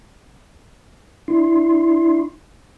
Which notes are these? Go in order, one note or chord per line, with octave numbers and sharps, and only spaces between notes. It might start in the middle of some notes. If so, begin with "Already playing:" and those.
D4 E4 C6